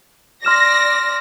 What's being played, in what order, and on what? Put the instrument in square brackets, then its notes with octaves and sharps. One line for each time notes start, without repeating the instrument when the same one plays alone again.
[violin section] D5 A#6 [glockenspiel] C6 F6 E7